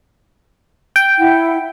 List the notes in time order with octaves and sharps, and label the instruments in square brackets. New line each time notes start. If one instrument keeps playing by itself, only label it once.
[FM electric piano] G5
[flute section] E4 F#5